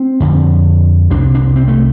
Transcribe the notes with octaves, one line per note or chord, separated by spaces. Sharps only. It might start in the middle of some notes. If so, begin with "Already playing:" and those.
Already playing: C4
F2 D3
C2 C3 D4
D4
C4
A3